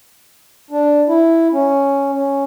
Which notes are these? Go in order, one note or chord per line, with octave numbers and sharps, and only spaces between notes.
D4
E4
C#4
C#4